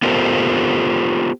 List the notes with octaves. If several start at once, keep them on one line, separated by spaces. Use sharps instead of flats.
B3 F4 G4 A4 A#4 C5